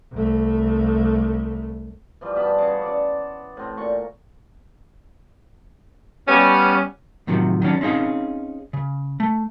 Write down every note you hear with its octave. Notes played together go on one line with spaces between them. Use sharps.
C2 A3
E3 F3 G3
G2 B3 A5 B5
C#3 A5
D5 D6
A2 C4
A#2 C#6
G3 B3 C#4
A2 C3 D#3 F3 F#3
D#3 F#3 C#4 D4
C4 C#4 D#4 G#4 F5
C#3
A3